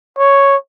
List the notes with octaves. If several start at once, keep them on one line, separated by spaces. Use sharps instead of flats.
C#5